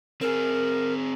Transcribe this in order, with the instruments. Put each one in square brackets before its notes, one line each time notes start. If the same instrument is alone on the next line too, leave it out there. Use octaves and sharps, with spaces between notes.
[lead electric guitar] C4 G#4 [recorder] A#4